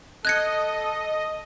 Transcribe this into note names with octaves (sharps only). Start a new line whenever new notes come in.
A4 D#5 F#6 G#6 C#7